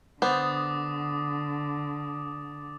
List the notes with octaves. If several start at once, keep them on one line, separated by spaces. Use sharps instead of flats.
D3 B3 C5 D6 D#6 A6